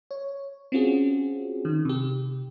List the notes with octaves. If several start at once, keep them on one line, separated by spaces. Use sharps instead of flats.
C#5
C4 C#4 F4 F#4 G#4
D#3
C3 G4